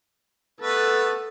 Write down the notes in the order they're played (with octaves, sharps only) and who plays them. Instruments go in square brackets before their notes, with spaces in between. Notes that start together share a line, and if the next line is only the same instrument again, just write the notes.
[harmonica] A3 B3 B4 [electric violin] A4